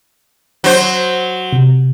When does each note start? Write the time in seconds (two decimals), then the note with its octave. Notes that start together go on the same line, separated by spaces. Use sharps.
0.64 F#3 C5
1.53 C3